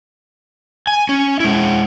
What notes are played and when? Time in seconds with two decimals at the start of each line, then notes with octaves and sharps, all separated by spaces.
0.87 G#5
1.09 C#4
1.40 G#3 E4